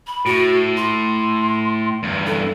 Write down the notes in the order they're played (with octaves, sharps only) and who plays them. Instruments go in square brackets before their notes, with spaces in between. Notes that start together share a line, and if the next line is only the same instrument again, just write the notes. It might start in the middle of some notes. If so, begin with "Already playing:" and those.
[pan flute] B5
[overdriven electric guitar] A2 [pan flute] F#4
[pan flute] C6
[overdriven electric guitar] E2 G2
[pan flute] A4